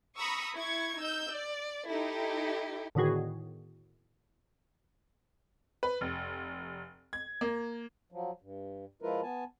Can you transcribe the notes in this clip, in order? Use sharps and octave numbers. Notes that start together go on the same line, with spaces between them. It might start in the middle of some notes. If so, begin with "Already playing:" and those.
A#5 B5 C#6 D#6 E6
E4 C#6 G#6
D#4 E6 G6
D5
D#4 E4 G4 A4
A2 D3 D#3 B3 F#4 G#4
B4
F1
G#6
A#3
F3 F#3
G2
F3 G#3 E4 F4 A#4 B4
B3 G#5 A5